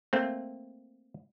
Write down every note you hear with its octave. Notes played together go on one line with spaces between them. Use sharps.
A3 A#3 C4